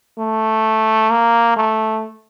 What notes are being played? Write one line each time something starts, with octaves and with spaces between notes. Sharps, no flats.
A3
A#3
A3